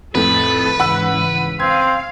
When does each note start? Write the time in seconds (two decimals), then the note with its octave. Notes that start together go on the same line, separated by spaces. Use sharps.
0.15 F2 A2 A4 B4
0.80 G#2 C#3 E3 F#5 B5 E6
1.60 C4 F5 G#6